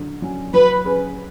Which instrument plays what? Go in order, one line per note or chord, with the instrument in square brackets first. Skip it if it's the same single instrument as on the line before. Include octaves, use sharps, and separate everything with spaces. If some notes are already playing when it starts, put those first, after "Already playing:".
Already playing: [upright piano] D3 F#3
F#3 C#4
[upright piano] F#3 [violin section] B4
[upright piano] C#4 G#4 B4